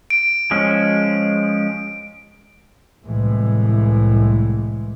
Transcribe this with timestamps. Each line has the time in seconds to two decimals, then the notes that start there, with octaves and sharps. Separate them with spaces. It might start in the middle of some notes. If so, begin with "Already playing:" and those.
0.10 D7
0.51 F3 G#3 C#4
3.04 C2 A2 E3 G#3